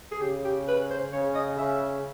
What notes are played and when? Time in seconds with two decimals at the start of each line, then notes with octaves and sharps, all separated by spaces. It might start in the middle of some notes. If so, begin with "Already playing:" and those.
0.11 G#4
0.21 C#3 G4
0.44 G4
0.68 B4
0.90 C5
1.12 C#3 C#5
1.35 D#5
1.58 C#3 E5